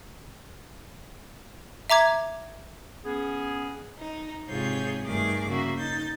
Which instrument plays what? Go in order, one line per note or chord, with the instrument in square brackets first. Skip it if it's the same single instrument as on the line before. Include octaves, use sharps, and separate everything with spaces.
[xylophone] E5 A#5 D6 G#6
[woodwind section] B3 C#4 G#4
[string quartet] D#4
G#2 C3 F4 G#4 C#5 G6
G2 D#3 A3 G#4 A#4 D6
C#3 A#3 F#4 E5
D#4 G6 A6